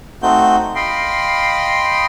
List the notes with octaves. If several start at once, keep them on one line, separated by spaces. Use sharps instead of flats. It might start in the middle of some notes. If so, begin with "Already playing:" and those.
A3 C4 D#4 F#4 G6
D#5 F5 G5 B5 C6